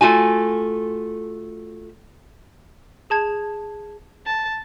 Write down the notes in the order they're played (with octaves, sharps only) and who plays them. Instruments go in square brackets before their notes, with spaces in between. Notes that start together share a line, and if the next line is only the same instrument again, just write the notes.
[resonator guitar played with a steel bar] A3 F4 F#4 G#5
[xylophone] G#4 A5 G#6
[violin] A5